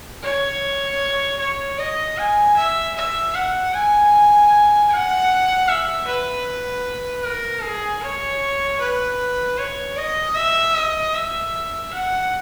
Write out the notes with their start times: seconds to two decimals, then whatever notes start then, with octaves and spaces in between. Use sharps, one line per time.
0.23 C#5
1.39 C#5
1.79 D#5
2.18 G#5
2.56 E5
2.96 E5
3.34 F#5
3.74 G#5
4.91 F#5
5.68 E5
6.07 B4
7.24 A#4
7.63 G#4
8.02 C#5
8.80 B4
9.58 C#5
9.97 D#5
10.36 E5
10.75 D#5
11.14 E5
11.92 F#5